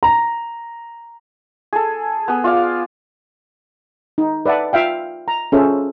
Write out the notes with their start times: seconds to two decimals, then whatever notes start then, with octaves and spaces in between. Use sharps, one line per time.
0.03 A#5
1.73 G#4 A4
2.28 B3 G#4
2.44 F4 D5 F5
4.18 D#4
4.46 B4 D5 E5 F#5 A5
4.73 F4 E5 F5 G5
5.28 A#5
5.52 C#4 F4 G#4 A4 C5 E5